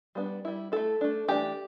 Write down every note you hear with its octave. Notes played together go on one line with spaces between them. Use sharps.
G3 B3 D4
G3 E4
A3 E4 A4
A3 D4
E3 A3 D4 G4